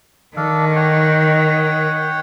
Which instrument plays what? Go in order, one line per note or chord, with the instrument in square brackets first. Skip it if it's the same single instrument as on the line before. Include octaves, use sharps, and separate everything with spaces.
[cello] D#3 [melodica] D4 A4 F5
[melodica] C#5 F#5 G5